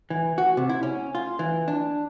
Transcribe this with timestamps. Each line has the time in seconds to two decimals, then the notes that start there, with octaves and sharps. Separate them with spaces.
0.10 E3
0.38 F#4
0.57 C3
0.69 E4
0.83 C#4
1.15 F4
1.39 E3
1.68 D4